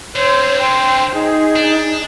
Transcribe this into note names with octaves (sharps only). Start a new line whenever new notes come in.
D3 C4 C5 C#5
C5 G5
D#4 G#4
D4